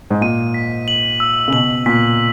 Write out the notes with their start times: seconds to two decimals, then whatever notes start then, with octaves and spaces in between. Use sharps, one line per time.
0.10 G#2
0.21 A#2 D#7
0.54 B6
0.88 F#7
1.20 E6
1.48 C#3
1.52 B2 F#7
1.86 A#2 B6